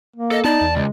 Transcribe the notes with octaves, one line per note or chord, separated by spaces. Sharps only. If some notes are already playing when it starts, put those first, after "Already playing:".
A#3
A4 D#5
B3 D#4 D5 A5
E2
C#2 G#3